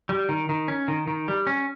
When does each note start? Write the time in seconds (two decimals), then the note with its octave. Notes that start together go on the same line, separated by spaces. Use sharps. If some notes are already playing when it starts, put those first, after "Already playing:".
0.09 G3
0.29 D#3
0.49 D#3
0.68 C#4
0.88 D#3
1.07 D#3
1.28 G3
1.47 C#4